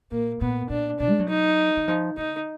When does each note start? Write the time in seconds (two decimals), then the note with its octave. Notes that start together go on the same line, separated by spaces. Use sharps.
0.11 A#2 A#3
0.41 A#2 B3
0.70 A#2 D4
1.00 B2 D4
1.09 G#3
1.19 F#3
1.28 D#4
1.77 D#3
1.88 F3
2.17 D3 D#4